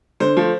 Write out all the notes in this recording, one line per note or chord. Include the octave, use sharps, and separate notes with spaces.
D3 C5
F3 A3